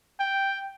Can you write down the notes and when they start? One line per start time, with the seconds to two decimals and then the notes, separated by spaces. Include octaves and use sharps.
0.20 G5